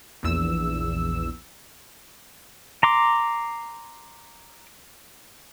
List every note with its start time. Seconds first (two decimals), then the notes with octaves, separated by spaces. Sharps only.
0.23 A#1 E2 E6
2.83 A#5 C6 D6